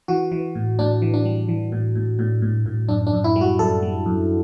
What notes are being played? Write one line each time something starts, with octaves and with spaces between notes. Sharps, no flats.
E3 F#4
E3
A2
A2 D4
E3
D4
G3
E3
A2
A2
A2
A2
A2
F#2 D4
D4
F#2
E4
G3
F#4
F#2 A4
G3
F#2